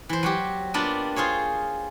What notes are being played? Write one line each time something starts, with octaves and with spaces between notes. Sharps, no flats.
E3 C5
F#3 F#4 G4
A#3 B3 D4 F4 G4
F4 G#4 C5 C#5